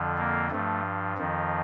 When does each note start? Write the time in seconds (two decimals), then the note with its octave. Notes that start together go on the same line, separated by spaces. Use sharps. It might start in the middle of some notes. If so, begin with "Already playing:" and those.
Already playing: F2 D3 F3
0.18 A#3
0.51 G2 F3 A3
1.17 F2 D#3 F3